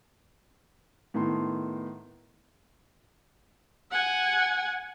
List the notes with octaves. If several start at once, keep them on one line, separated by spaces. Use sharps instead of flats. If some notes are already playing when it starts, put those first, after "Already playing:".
A2 D#3 B3 A5 C6
F#5 G#5